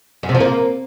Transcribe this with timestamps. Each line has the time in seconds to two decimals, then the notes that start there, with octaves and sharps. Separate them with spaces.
0.23 F#2
0.29 C3
0.35 F3
0.40 A#3